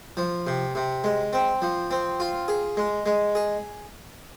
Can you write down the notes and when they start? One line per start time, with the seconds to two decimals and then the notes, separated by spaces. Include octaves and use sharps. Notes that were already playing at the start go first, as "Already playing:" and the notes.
0.17 F3
0.47 C3
0.75 C3
1.04 G#3
1.33 C4
1.62 F3
1.91 C4
2.20 F4
2.48 G#4
2.77 G#3
3.06 G#3
3.35 G#4